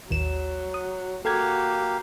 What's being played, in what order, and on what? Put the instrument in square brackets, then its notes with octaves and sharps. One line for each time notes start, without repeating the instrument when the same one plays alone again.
[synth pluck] A1 D#2 E7 [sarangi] F#3
[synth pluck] D#6
[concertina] A#3 G4 F5 [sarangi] F#4 [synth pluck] A4 G#6